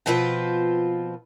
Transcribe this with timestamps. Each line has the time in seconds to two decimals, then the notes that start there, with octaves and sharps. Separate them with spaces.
0.06 B2 F3 C4 F4 B4